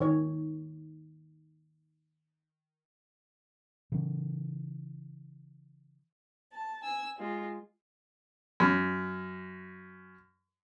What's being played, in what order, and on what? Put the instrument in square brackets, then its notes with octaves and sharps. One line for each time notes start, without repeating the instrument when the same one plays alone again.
[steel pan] D#3 C#5
[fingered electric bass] C#3 E3
[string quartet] A5
G#5 E6
G#3 F4
[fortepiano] F#2 F6